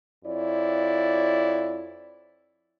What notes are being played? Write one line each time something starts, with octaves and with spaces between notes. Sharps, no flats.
F2 E4 C#5 D5